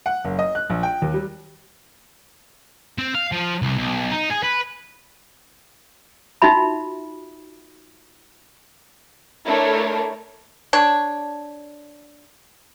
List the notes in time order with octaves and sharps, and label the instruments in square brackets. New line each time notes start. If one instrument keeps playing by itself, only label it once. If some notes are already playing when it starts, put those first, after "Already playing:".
[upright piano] F#5
F#1
D#5
F#6
A#1
G5
D#2
G3
[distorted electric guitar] C4
F5
F3
C2
B1
D#4
G#4
B4
[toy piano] D#4 F4 F#4 E5 B5
[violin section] A3 D4 E4 A4 A#4 C#5
[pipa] D4 C#5